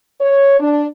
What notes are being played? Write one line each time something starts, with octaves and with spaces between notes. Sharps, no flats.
C#5
D4